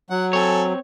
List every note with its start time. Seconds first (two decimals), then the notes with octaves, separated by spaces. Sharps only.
0.10 F#3 F#5
0.33 C4 A4 C#5 G#5